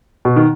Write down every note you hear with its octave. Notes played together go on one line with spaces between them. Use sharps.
B2
D#3